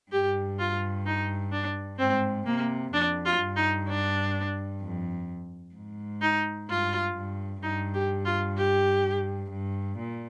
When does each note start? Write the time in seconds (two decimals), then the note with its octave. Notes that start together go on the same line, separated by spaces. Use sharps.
0.12 G2 G4
0.59 F4
1.06 D#4
1.52 D4
1.99 G#2 C4
2.46 C3 A#3
2.93 F2 D4
3.25 F4
3.41 G2
3.56 D#4
3.88 D4
4.82 F2
5.75 G#2
6.22 D#4
6.69 G2 F4
7.16 G2
7.63 G2 D#4
7.94 G4
8.25 F4
8.57 G4
9.51 G2
9.98 A#2